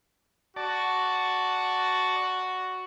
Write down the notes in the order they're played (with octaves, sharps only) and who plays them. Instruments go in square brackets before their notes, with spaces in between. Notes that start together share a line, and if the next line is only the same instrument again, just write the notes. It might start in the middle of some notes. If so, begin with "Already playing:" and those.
[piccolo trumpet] F#4 [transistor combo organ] D5 A5